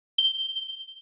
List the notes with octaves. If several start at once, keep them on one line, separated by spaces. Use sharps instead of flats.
G7